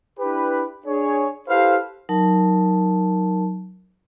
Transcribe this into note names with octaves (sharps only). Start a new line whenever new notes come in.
D4 E4 G4 B4
D4 G#4 C#5
E4 G4 A4 B4 C5 F5
F#3 D#4 A#4 A5